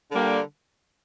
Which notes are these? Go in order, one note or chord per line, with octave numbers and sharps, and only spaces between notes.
D3 G3 A#3